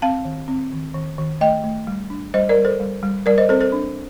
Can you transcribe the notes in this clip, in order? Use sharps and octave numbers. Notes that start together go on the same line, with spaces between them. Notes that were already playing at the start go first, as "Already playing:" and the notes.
C4 F5 A5
D#3
C4
D#3
D#3
D#3
A3 D#5 G5
A3
G3
D4
G3 C5 D#5
A#4 D5
G3
A4 C5
G3
G3
G3 A#4 D5
C5 D#5
C4 A4 C5
A4 C5
D4